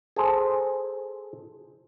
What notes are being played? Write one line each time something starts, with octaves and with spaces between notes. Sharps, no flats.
G#4 A4 C5